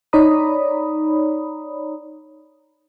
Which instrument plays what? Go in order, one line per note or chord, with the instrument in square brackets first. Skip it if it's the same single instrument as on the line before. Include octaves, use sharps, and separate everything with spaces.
[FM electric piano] D#4 C#5 D5 A#5 B5 D#6